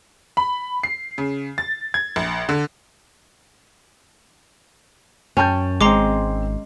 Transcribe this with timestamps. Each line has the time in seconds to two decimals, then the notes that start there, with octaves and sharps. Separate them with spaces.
0.37 B5
0.83 C7
1.18 C#3
1.58 A6
1.94 G#6
2.16 A#1
2.49 D3
5.37 F#2 C#4 G5 A5 G6
5.81 G#1 G#3 C4 A#5 C6 D6 C7